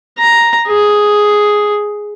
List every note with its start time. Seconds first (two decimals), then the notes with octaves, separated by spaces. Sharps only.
0.19 A#5
0.68 G#4